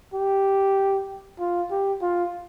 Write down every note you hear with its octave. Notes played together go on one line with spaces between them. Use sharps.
G4
F4
G4
F4